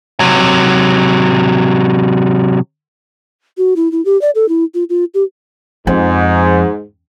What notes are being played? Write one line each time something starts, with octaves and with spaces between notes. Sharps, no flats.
C3 F#3
F#4
E4
E4
G4
D5
A4
E4
F4
F4
G4
F2 G#2